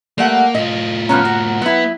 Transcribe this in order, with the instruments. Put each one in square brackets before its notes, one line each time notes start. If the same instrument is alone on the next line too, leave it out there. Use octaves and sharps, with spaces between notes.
[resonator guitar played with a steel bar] G3 A3 F#5 [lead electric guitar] A#3
[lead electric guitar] A2 F4 [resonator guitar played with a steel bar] D#5
[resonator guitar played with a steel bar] F3 B3 C#4 [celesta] A#5 F6
[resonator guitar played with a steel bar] F#4
[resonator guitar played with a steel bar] F#3 E4 [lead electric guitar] B3